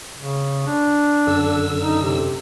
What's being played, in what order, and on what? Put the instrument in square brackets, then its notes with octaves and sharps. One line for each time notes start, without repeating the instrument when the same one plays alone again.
[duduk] C#3
D4
[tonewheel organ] F#2 D3 E6
[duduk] D#4
C3